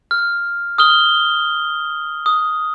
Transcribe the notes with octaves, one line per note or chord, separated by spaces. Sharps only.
F6
D#6 F6 G7
D#6